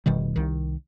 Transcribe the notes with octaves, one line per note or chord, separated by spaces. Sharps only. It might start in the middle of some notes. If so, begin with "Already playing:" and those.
F1 B2 D#3 G3
C2 D#3